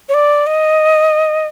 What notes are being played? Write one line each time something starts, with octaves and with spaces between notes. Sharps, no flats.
C#5
D5
D#5